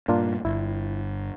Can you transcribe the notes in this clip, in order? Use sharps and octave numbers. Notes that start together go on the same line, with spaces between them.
G2 A#2 A#3 D4 F4
G1 G2 E4